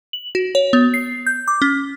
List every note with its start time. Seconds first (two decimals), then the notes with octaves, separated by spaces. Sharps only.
0.13 F#7
0.35 F#4
0.55 C#5
0.73 B3
0.94 C7
1.26 G6
1.48 D6
1.62 C#4